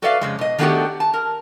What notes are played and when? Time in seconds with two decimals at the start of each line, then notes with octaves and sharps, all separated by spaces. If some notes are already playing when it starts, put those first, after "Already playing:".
0.02 F#4 A4 B4 D5 E5 F5
0.21 F2 C#3 G#3
0.39 B2 D#5
0.58 D#3 A3 B3 D4 F#4 G4
1.00 A5
1.14 A#4